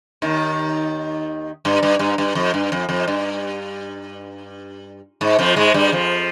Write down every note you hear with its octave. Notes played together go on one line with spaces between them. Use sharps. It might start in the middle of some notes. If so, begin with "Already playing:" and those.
D#2 D#3
G2
G2
G2
G2
F2
G2
F2
F2
G2
G#2
F2 F3
G#2 G#3
G2 G3
F2 F3